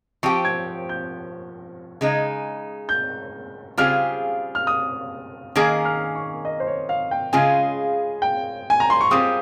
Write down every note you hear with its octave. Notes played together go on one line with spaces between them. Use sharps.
F3 C4 G4 C#6
G#6
G6
C#3 G#3 D#4
G6
C#3 G3 C4 F4 G#4 F6
F6
D#6
D#3 A#3 C#4 G#4 D#6
F6
C#6
D#5
C5
C#5
F5
G5
C#3 G#3 C#4 F4 G#4 G#5
G5
G#5
A#5
C6
C#6
G3 C4 F4 G#4 D#6